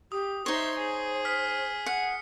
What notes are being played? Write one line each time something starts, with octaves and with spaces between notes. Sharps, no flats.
G4 D#6
D#4 C5 C#5 E5 C6
G#4
D#6 F6 B6
F#5 C#7